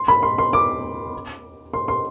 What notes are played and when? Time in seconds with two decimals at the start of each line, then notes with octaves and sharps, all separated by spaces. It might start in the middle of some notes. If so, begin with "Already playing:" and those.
Already playing: C6
0.08 B5
0.23 C6
0.38 C6
0.53 D6
1.74 C6
1.88 C6